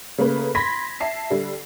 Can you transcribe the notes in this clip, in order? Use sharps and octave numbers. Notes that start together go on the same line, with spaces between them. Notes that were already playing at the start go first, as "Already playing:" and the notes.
C#3 A3 A#3 B4
B5 C6 G#6 A#6 B6
E5 A5 C7
D3 G3